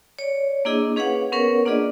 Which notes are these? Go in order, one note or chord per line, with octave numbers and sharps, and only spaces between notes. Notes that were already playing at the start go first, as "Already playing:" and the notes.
C#5 D5
A#3 D4 E4 G#4 D#5
C#4 G#4 B4 C#5 F5 F#5
B3 C#4 A#4 B4 C#5 F#5
A#3 D4 F4 G#4 D5 D#5